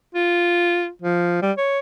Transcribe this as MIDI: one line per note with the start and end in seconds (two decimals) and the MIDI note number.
0.15 0.89 65
1.02 1.42 53
1.42 1.52 55
1.58 1.79 73